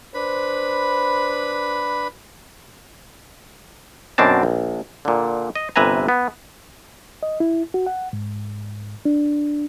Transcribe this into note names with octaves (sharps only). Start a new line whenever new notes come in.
D4 B4 C5 B5
F#2 B2 C4 D4 A5
A#1
A#2 D3
D#5
G1 C3 B4 E5 G#5 A#5
B3
D#5
E4
F#4
F#5
G#2
D4